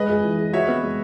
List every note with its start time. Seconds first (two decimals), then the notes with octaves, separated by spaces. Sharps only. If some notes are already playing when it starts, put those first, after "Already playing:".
Already playing: G#3 B4 D#5
0.09 G#4
0.24 E3
0.38 G#4
0.53 F#4 C#5 E5
0.68 B3
0.83 G#3